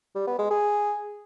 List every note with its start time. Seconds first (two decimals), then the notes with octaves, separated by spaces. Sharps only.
0.15 G3
0.27 B3
0.39 G#3
0.51 G#4